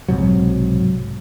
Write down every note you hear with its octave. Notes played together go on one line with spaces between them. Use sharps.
B1 G#2 C3 F#3